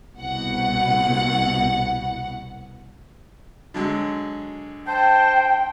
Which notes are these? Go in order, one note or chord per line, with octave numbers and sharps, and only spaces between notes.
C2 B2 F#5
D3 F#3 G#3
C5 G5 A5